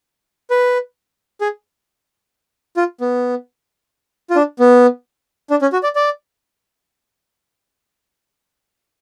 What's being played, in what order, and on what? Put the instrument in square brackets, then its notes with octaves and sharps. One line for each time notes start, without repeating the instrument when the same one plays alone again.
[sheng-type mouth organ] B4
G#4
F4
B3
F4
D4
B3
D4
C#4
F#4
D5
D5